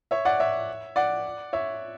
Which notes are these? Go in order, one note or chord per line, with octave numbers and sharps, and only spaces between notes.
C#5 E5
D5 F#5
C#5 E5
D5 F#5
C#5 E5